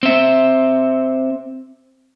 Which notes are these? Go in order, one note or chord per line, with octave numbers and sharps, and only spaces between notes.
C4 E5